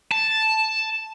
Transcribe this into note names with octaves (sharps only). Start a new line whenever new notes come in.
A5